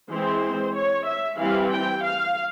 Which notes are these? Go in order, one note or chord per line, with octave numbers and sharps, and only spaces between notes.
E3 G#3 C4 C5
C#5
E5
E3 G3 C4 F5
G5
F5